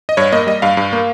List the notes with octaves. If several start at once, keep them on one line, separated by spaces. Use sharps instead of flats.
D#5
G2 C#5
A#3 D#5
G3 D#5
G2 F5
G2
A#3